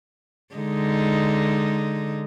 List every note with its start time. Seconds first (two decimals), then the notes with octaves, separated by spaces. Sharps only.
0.55 D3 G#3 D#4